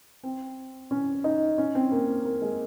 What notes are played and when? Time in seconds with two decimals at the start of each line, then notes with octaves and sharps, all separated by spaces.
0.23 C4
0.91 C#4
1.24 D#4
1.58 C#4
1.75 C4
1.92 A#3
2.25 A#3
2.42 G#3